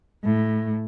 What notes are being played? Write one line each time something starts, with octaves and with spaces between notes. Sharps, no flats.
A2